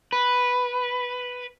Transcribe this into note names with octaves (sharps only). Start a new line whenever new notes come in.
B4